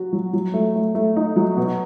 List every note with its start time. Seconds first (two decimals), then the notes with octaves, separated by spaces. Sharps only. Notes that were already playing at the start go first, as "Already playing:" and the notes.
Already playing: F#3 F#4
0.13 F#3
0.33 F#3
0.54 A3
0.75 A3
0.95 A3
1.16 D#4
1.36 F#3
1.57 B2